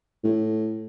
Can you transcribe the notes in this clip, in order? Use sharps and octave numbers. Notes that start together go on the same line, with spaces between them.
A2